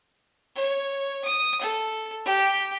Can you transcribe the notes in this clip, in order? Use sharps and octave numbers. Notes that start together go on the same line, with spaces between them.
C#5
D#6
A4
G4